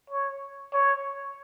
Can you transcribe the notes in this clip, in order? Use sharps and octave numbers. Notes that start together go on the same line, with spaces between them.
C#5
C#5